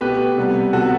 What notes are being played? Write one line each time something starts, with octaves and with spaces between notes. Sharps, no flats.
B2 A3 G4 B4
C3 G3 B3
C3 F#3 B3 F#4 A4